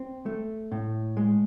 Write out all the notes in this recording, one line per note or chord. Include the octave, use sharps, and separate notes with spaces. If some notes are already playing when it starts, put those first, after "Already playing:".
Already playing: C4
A3
A2
G#3